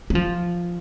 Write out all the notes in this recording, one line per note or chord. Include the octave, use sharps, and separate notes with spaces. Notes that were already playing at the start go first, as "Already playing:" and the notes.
F#3
F3